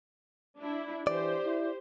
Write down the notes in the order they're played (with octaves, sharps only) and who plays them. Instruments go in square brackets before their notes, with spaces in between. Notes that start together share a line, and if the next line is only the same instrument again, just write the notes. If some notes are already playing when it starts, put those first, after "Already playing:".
[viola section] D4 E4
[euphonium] E3 [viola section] G4 C5 [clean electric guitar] D5
[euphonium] E4